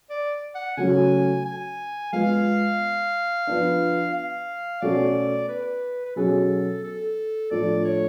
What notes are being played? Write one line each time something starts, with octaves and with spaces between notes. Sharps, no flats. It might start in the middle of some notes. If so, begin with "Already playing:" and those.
D5
F#5
C#3 F#3 A3 C#4 F#4 G#5
G#5
G#3 B3 F4 F5
F3 B3 D4
F5
B2 A3 C#4 F#4 A4 D5
B4
B4
B2 F#3 C#4 G#4 A4
A4
A2 F3 A3 D4 D5
C#5